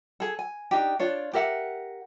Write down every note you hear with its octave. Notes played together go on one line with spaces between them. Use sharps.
G#4 A4
G#5
D4 D#4 G4
D4 F4 C#5
G4 A#4 E5 F#5